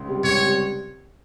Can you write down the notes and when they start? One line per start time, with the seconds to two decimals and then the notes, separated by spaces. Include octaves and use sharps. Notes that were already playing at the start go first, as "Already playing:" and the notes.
Already playing: C#2
0.08 C3 G3
0.23 C#2 C#5
0.39 C3 G3